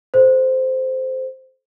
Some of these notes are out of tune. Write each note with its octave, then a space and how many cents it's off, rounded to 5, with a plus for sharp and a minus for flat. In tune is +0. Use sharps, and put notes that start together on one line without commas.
A4 -30 C5 -10